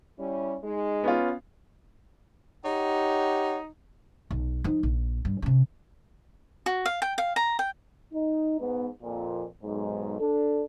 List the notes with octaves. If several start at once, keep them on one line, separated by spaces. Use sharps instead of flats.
G3 C#4 E4
G#3 D#4
B3 C#4 F4
D#4 G4 C#5 F#5
B1
F3 D#4
A#1
G2
C3 C#4
F#4
F5
G5
F5
A#5
G5
D#4
G#2 B3
F2 A#2
B1 G#2
D4 A4